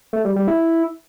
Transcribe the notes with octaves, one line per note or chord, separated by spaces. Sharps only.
A3
G3
G3
E4